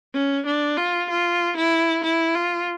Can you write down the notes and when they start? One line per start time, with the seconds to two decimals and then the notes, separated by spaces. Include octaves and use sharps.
0.14 C#4
0.46 D4
0.77 F4
1.10 F4
1.57 E4
2.03 E4
2.35 F4